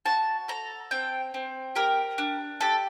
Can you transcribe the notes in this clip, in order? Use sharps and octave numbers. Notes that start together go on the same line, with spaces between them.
F#4 A5
A4 A#5
C4 G5
C4
G4 A#4
D4
G4 A4